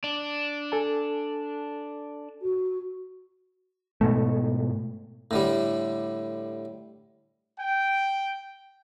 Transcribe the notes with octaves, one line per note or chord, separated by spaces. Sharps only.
D4
A4 G#5 A5
F#4
G#2 B2 A3
A2 D3 G3
G5